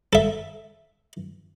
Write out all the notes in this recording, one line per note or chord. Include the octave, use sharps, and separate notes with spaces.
A4 E5